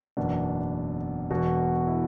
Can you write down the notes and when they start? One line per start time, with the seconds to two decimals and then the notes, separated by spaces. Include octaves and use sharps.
0.17 F#1 E2 B2 D4
1.30 E1 E2 B2 F#4
1.87 E4